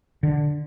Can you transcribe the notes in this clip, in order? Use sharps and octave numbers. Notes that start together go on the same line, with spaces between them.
D3